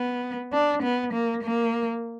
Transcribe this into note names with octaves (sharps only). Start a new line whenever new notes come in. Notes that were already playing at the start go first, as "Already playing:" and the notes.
Already playing: B3
D4
B3
A#3
A#3